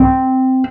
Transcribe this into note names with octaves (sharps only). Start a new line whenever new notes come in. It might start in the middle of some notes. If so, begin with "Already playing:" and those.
Already playing: C4